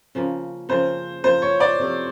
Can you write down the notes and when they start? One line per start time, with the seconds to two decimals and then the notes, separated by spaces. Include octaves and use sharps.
0.15 C#3 F3 A#3
0.69 C#3 F3 A#3 C5
1.24 C#3 F3 A#3 C5
1.42 C#5
1.60 D5
1.79 C3 F3 A3